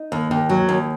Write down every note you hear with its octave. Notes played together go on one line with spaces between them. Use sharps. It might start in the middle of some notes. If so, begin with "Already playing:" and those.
Already playing: D#4
D#2
D#2
F#3
D#2